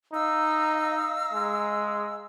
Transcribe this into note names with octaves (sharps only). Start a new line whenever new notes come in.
D#4 F5 A#5 E6
G#3